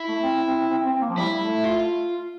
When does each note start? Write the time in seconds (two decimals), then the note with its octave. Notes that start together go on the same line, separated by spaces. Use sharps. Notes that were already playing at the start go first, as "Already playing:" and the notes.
Already playing: E4
0.09 A3
0.23 C4
0.48 C4
0.71 C4
0.86 C4
1.02 A#3
1.09 F3
1.18 G3 E4
1.41 A3
1.64 F4